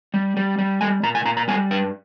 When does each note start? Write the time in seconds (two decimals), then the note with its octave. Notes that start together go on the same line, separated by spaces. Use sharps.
0.14 G3
0.37 G3
0.58 G3
0.81 G3 G#5
1.03 A#2 A#5
1.15 G#5
1.25 A#2 A#5
1.37 A#5
1.48 G3 G#5
1.71 G2 G5